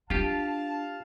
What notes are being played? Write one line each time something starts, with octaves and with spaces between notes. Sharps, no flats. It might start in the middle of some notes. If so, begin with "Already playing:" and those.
D4 F4 G4 F5 A5